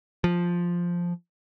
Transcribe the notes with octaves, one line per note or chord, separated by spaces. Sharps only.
F3